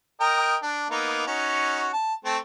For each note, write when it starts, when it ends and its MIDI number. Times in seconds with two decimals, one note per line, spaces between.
0.20 0.56 70
0.20 0.56 75
0.20 0.56 79
0.63 0.90 62
0.90 1.26 58
0.90 1.26 59
0.90 1.26 63
1.27 1.89 61
1.27 1.89 63
1.27 1.89 66
1.93 2.14 81
2.25 2.37 57
2.25 2.37 60